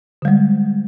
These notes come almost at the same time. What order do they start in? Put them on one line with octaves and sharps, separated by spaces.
D3 G3 G#3